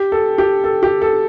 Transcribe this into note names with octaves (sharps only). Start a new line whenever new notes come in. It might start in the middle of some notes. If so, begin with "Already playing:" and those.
Already playing: G4
A4
G4
A4
G4
A4